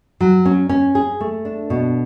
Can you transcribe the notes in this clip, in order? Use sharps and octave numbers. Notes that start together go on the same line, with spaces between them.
F#3
C#4
C#4
G#4
A3
D4
B2